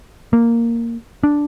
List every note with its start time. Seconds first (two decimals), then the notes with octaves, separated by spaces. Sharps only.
0.33 A#3
1.23 D4